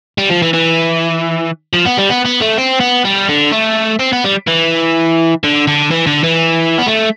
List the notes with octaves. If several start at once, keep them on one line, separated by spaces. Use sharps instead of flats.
G3
F3
E3
E3
F3
B3
G3
B3
B3
A3
C4
B3
G3
D3
A3
C4
B3
G3
E3
D3
D3
E3
D3
E3
B3
A3